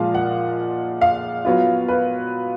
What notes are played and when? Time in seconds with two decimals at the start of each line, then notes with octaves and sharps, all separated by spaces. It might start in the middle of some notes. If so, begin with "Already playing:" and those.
Already playing: A#2 F3 G#3 F5
0.15 F#5
1.01 F5
1.45 F#3 B3 F4
1.88 B4